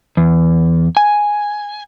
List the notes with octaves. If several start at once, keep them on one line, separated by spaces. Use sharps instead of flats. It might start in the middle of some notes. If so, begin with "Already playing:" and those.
E2
G#5